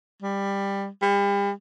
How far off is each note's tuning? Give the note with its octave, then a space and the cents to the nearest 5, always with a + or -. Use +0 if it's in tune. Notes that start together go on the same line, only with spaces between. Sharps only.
G3 +15
G3 +40